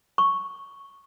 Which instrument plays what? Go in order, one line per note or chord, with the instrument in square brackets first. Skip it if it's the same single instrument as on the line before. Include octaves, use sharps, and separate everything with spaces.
[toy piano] C#6